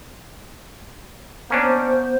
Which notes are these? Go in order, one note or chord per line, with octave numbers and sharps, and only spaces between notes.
A#3 B3 C#4 D4 C5